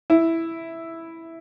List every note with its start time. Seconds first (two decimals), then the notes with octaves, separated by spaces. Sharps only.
0.10 E4